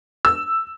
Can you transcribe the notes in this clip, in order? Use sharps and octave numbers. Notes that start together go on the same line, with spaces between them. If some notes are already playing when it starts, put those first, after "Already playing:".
E6